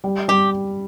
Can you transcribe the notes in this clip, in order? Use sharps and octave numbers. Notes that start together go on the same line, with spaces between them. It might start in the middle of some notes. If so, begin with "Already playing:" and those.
G3
G3 G4